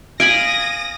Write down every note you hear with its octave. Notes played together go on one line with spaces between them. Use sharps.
F5 G#5 B5 D#6 A#6 D7